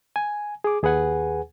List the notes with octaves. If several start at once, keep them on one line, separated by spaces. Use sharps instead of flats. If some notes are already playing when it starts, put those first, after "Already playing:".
G#5
G#4 D6
D#2 G#4 B4 F#5 G#5